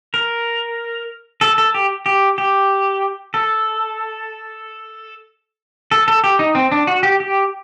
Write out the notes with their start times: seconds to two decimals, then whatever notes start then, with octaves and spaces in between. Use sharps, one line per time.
0.14 A#4
1.41 A4
1.58 A4
1.74 G4
2.06 G4
2.38 G4
3.34 A4
5.92 A4
6.08 A4
6.24 G4
6.39 D#4
6.55 C4
6.72 D4
6.87 F#4
7.03 G4
7.20 G4